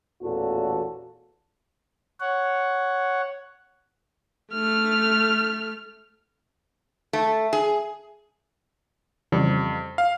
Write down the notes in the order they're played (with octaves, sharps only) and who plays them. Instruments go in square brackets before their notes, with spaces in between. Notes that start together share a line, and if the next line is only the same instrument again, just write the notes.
[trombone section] A1 E2 A#2 F#4 A4
[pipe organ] C#5 F#5
[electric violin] A3 F6
[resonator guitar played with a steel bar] A3
G#4
[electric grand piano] F2 [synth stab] C#3 E3 G3
[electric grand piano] F5